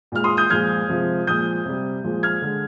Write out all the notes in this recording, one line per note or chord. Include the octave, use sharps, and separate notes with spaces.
A#2 G#3 F6
C6 D#6
D#6 G6
A#2 F3 G#3 F6 G#6
C3 F3 G#3
A#2 F3 G#3 D#6 G6
C3 G3
A#2 F3 G#3
F6 G#6
D3 G#3